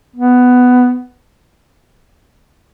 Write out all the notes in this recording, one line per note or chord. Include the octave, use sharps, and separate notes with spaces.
B3